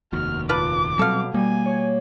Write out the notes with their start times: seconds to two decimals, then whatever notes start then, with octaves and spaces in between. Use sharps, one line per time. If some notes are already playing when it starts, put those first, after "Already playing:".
0.13 F1 D#2 F#4 F6
0.49 A#2 F4 B4 A5 D6 F#6
0.99 B2 F#3 G3 C4 A4 F5
1.34 B2 G3 A#3 G#5
1.66 C#5